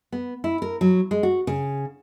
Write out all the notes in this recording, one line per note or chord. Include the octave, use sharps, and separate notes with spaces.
B3
E4
A#4
F#3
G#3
F#4
C#3